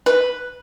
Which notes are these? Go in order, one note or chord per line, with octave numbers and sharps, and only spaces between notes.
B4